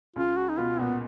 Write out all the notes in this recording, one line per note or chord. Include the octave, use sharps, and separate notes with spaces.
C#2 C#3 F4
F#4
D#4
B2 B3 F4
A#2 A#3 B3